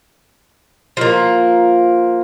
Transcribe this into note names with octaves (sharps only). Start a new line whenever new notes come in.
F3 A#3